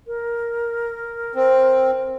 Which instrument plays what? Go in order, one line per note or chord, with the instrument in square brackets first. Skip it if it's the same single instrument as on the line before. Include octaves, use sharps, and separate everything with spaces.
[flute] A#4
[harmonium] C4